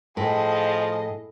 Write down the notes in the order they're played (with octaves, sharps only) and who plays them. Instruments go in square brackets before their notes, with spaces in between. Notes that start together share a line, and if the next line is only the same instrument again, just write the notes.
[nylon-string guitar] A2 [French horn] F3 [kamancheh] G#4 D#5